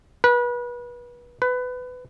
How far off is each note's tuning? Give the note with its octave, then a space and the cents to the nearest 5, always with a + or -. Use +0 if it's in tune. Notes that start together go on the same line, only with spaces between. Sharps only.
B4 -30
B4 +20